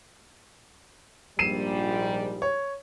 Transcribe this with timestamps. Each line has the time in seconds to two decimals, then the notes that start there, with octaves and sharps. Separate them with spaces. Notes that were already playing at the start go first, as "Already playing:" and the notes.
1.39 A#1 G#2 G3 C7 D#7 E7
2.42 C#5